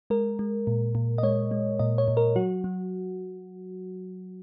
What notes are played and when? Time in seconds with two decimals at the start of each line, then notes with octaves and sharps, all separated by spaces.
0.10 G#3 A#4
0.39 G#3
0.67 A#2
0.95 A#2
1.18 D#5
1.23 G#3 C#5
1.51 G#3
1.79 A#2 D#5
1.98 C#5
2.08 A#2
2.17 A#4
2.36 F#3 F#4
2.64 F#3